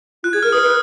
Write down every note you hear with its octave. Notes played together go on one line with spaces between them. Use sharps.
F4 F#6
G#4 G#6
A#4 F6
B4 D#6
B4